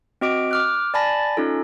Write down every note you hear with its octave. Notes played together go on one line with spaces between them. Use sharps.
C4 F#4 D#5 D6 D7
D6 F6 F#6
D5 G#5 A5 B5 A6 A#6
C#4 D#4 F4 A4